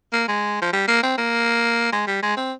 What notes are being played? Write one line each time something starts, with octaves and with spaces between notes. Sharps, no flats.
A#3
G#3
F3
G3
A#3
C4
A#3
G#3
G3
G#3
C4